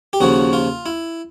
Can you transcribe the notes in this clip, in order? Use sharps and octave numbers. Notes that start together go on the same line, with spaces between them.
G4
D#2 C#3 F3 F#4
F4
E4